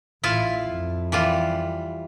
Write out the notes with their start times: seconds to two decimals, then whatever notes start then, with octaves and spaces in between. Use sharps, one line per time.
0.23 A1 E4 F4 F5
0.68 F2
1.12 E3 G3 F4